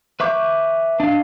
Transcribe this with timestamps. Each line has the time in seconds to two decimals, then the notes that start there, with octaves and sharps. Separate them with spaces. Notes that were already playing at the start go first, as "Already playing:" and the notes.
0.20 B4 E5 C#6 D6 G6
1.00 D4 D#5 F5